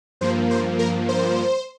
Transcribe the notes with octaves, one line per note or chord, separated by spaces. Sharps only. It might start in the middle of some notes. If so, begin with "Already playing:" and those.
G2 F3 A#3 C5
C5
A#4
C5